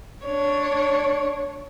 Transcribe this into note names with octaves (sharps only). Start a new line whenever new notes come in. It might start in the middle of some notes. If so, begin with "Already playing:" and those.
D4 C#5